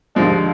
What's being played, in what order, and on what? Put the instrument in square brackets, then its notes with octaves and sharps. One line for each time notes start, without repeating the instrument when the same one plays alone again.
[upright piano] D#2 D3 F3 G#3 D4